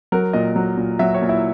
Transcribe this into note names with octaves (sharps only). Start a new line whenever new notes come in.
F#3 A#4
A#2 D#5
F#3
A#2
F#3 E5
C#5
A#2
E4